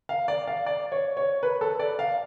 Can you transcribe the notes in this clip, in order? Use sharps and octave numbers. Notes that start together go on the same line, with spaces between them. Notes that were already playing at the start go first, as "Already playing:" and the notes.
F5
D5
F5
D5
C#5
C#5
B4
A4
D5
F5